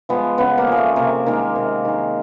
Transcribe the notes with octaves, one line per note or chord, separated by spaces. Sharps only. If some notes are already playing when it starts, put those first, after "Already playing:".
F3 G#3 B3
C#3 B3
A#3
F3 G#3
A3
C3 A#3
D#3 G#3 A#3
C3
D#3 G#3